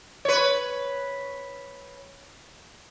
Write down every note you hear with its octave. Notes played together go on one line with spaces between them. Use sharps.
B4 C#5